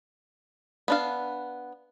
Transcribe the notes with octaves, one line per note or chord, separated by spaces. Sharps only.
B3 D4 F5